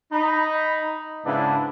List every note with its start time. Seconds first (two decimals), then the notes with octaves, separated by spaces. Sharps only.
0.12 D#4 B5
1.25 G#2 C#3 B3 D4 E4